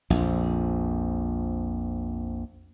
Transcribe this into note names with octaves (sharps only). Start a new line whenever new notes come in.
A#1 F2